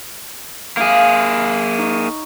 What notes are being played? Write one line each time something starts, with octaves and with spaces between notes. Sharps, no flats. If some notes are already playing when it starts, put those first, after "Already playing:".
A#3 G#4 E5 F5 A#5
D#4 C#5